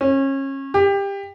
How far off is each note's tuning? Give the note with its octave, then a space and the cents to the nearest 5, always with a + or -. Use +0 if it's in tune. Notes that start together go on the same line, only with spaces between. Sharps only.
C#4 -30
G4 +20